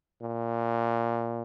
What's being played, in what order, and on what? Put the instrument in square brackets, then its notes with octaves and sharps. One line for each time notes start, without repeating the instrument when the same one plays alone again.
[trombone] A#2